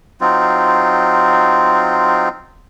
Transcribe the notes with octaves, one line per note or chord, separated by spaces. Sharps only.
F#3 C4 D#4 F4